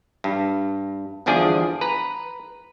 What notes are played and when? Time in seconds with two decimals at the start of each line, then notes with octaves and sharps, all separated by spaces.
0.24 G2
1.26 G1 E2 F3 D4 G#4 D5
1.81 B4 A#5